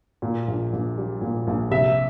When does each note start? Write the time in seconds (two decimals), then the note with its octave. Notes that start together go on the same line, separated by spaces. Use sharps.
0.22 A#2
0.48 A#1
0.73 A#1
0.98 G3
1.21 A#2
1.47 A#1
1.71 C3 E5